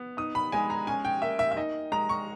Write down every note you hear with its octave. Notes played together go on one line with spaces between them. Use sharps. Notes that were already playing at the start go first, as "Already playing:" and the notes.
Already playing: B3
D#4 D#6
B5
G#3 G#5
A#5
C#4 G#5
G5
A#3 E5
E5
E5
D#4 D#5
G#3 A#5
C#6